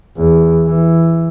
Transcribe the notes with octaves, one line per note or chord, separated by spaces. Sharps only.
E2
E3